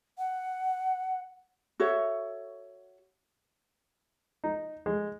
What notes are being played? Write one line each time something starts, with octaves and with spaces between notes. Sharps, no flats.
F#5
F#4 A4 C#5 E5
D#4
G#3